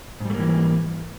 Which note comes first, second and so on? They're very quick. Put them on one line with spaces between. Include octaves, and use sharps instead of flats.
G#2 G3 A3 A#3 E3